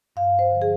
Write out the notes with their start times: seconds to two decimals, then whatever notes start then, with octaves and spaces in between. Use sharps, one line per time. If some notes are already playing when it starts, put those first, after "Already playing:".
0.16 G2 F5
0.39 C5
0.51 D3 F3
0.62 G#4